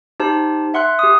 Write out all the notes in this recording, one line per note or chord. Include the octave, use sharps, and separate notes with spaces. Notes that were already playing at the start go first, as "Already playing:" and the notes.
D#4 G4 C5 A5
E5 F#5 C6 F#6
G4 D#6